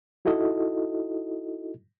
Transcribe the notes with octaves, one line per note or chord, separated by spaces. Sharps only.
D#4 E4 F#4 A4 D#5